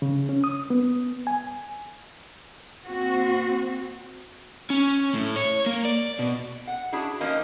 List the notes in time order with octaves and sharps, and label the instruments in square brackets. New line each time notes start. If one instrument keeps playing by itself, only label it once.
[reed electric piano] C#3
C#4
D#6
B3
G#5
[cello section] A#3 C4 F#4
[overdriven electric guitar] C#4
A2
C#5
A#3
D5
B2
[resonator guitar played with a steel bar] F#5
D4 E4 F#4 G#4
E3 F3 A#3 C#4 D#4